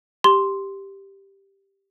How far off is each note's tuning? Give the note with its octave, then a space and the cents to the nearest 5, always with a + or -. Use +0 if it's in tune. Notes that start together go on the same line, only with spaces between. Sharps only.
G4 +0 C6 +0